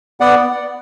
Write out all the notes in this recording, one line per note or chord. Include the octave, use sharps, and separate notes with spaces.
B3 D5 F#5